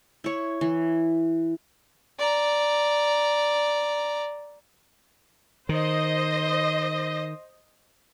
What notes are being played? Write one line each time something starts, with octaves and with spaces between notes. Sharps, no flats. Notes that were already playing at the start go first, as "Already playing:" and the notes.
E4 C#5
E3
D5 A#5
D#3 C5 D#5